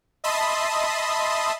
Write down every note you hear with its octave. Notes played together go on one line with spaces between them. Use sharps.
D#5 E5 A5 B5 C6 D#6